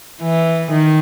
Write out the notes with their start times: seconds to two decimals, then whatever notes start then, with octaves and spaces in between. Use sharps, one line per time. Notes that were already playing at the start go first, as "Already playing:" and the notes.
0.22 E3
0.71 D#3